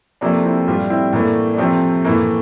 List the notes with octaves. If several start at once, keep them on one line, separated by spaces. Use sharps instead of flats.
C3 F3 A3 A#3 D4
C4 E4
A2 G3 D4 F4
C4 E4
A2 E3 A3 A#3 D4
D4
C3 F3 A3 C4
A2 E3 A3 A#3